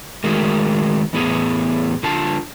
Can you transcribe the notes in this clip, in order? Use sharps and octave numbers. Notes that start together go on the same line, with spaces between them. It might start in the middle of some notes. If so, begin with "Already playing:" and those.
D#3 G#3 A3 F#4 G#4 A#4
E2 A2 B3 G#4
D3 F4 A5